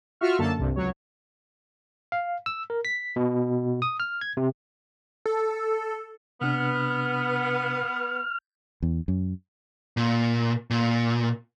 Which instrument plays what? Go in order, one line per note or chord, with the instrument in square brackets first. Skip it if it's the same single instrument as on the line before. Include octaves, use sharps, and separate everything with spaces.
[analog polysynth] F4 F#4 E5 C#6 F6
F#2 D3 A#3 A4 A5
C2 G2 C3
C#2 F#3 C#5
[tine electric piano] F5
E6
A#4
B6
B2
D#6
F6
G#6
C3
[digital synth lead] A4
[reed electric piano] C3 D4 [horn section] B3 [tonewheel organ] F6
[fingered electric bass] E2
F#2
[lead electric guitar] A#2
A#2